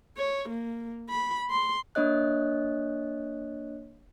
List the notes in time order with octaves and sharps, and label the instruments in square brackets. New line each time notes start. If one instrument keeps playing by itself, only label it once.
[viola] C#5
A#3
B5
C6
[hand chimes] A#3 D4 C#5 D#5 F#6